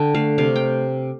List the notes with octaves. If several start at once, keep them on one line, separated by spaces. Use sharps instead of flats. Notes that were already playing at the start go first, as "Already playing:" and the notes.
Already playing: D3 G5 A5
A3 F5
C3 F5
G5